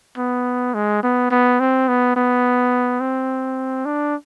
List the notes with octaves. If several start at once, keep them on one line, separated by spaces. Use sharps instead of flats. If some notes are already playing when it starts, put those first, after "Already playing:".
B3
G#3
B3
B3
C4
B3
B3
C4
D4